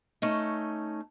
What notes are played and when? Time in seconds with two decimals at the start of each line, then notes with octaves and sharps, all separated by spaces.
0.22 A3 C#4 D#4